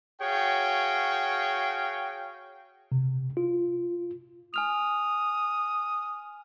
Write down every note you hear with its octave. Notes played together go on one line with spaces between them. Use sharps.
F#4 G#4 C#5 F5 G5
C3
F4
G#5 D#6 F6 F7